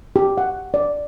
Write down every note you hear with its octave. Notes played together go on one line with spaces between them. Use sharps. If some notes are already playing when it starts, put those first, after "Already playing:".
G4
F#5
D5